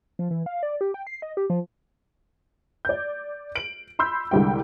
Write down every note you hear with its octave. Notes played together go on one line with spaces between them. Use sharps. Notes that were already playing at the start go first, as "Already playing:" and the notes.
F3
E3
F5
D5
G4
G5
C7
D#5
G4
F3
D5 G6
D7 F#7
B5 C6 E6 G6
C2 D3 G3 G#3 G5